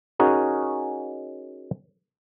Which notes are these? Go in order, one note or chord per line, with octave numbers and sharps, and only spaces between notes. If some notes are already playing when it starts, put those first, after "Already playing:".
C#4 D#4 F#4 G#4 A#4